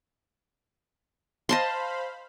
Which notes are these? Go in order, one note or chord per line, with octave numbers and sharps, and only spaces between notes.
C5 D#5 F5 A5 B5 C6